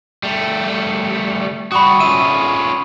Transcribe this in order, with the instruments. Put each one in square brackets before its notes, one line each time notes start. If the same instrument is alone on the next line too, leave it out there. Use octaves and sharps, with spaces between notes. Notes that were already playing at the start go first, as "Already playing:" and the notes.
[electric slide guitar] G3 A3
[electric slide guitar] G3 F#4 [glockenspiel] B5 C#6 D#6
[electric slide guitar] C#4 F4 E5 [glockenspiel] D#7